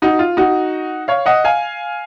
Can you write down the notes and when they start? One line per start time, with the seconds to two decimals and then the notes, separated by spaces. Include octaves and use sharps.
0.02 D#4 F#4
0.19 F4
0.37 D#4 F#4
1.08 C#5 F5
1.26 D#5 F#5
1.44 F5 G#5